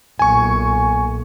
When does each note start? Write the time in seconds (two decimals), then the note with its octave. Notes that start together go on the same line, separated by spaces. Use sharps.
0.19 B1 A#2 G#5 C#6